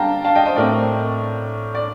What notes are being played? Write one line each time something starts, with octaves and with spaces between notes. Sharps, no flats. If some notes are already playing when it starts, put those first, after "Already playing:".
Already playing: D3 G3 F5 G5 A5 A#5
F5 A5
D#5 G5
C5 D#5
A2 A3 C4 A#4 D5
D5